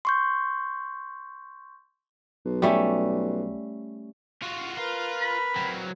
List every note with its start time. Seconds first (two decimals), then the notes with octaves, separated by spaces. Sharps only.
0.05 C6 C#6 G6
2.45 B1
2.62 G3 A3 C#4
4.42 F4 F#4
4.77 F4 A#4 B4
5.21 B5
5.56 F#3 C4